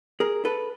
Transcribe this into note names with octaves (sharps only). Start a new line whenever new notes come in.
G#4 A#4
A4 B4